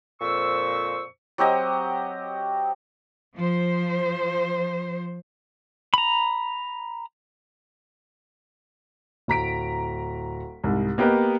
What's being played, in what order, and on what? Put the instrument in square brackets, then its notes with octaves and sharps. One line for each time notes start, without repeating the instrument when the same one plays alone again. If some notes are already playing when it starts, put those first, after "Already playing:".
[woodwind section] F2 A#2 C5 C#6 E6
[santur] F#3 C4 G4 D#5
[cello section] F3 C5
[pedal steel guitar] A#5 B5
[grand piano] D1 A#5 B6 D7
C2 G#2
A#3 B3 G4 A#4 B4 D#5